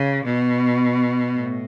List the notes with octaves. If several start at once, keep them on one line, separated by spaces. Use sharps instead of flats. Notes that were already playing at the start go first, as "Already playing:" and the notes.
Already playing: C#3
B2
A2